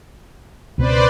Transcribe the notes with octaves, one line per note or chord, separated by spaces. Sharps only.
C#2 B2 C4 B4 C5 D5